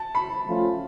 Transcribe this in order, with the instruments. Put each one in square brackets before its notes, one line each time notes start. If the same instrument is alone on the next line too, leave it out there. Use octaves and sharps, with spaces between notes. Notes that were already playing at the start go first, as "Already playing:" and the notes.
Already playing: [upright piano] A5
B5
[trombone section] F3 A3 C#4 F4